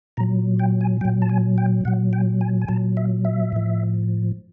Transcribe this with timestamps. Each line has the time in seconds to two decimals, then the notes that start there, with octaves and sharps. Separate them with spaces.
0.17 A#2 F#3 A#5
0.59 G5
0.81 G#5
1.01 A#2 F#3 G5
1.22 A5
1.29 G#5
1.58 G5
1.85 A#2 F#3 F#5
2.13 G5
2.41 G#5
2.61 G#5
2.68 A#2 F#3 A5
2.97 E5
3.25 E5
3.53 A2 F3